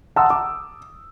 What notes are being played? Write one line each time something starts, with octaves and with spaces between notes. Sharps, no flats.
F#5 A5 A#5 C6 D#6 E6
D6